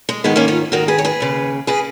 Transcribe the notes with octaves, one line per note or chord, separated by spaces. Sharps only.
G#3
G#2 D#3 G#3 B3
A#3 C#4
C#4 F4
G#2 D#3 F#4 A#4
G#4 B4
C#5
G#4 B4
D#2 C#3
C#3 G#4 B4